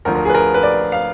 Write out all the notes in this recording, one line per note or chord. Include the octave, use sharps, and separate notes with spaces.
D2 D3 F3 A#4
A#4
G#4
B4
A#4
B4
D5
F5